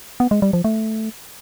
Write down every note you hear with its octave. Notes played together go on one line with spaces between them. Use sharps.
B3
G#3
G3
F3
A3